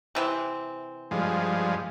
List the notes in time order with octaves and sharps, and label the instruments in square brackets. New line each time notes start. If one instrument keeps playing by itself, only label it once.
[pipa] C3 E3 C4
[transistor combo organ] G2 F3 G#3